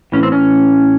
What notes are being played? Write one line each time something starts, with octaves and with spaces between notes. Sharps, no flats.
A2 E3 C#4
C4
C#4